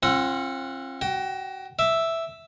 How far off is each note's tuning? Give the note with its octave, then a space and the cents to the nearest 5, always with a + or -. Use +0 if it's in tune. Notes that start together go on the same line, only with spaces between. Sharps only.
C4 +40 F4 -20 F#5 -10
F#4 +25 G5 +0
E5 +0 D6 +0